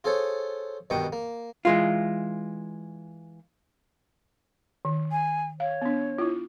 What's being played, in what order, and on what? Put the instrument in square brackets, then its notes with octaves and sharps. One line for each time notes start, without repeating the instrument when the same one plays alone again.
[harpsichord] F4 G#4 A4 C5 C#5
G2 B2 D#3 G5 C#6 D#6
A#3
[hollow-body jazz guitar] E3 G#3 F4
[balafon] D#3
[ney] G#5
[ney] C#5 [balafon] F5
[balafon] B3 D4
E4 F4